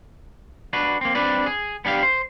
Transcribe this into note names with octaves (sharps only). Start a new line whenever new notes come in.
D4 F#4 B4
A#3 C4
C4 D4 B4 D5
G#4
B3 D4 G4 F5
C5